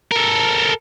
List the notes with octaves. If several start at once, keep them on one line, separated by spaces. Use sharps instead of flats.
A4 A#4